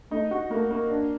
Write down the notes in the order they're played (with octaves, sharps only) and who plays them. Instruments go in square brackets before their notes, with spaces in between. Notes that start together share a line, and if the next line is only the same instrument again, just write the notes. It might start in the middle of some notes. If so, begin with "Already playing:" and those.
[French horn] A3 [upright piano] D#4
[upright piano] F#4
[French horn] A3 [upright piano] A#3
[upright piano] A#3
D4